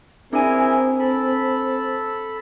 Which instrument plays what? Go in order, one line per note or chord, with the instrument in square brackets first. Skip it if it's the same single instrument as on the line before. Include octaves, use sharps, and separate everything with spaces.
[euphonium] C4 [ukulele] D4 G#5 [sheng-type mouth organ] E4 G#4 A#4
[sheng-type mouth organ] A4 B5